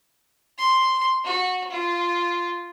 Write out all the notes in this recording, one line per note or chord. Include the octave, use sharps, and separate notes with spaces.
C6
F#4
F4